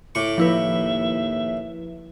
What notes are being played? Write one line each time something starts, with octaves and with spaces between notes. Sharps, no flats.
A2 C#6 D6
D#2 F3 E4 B4 E5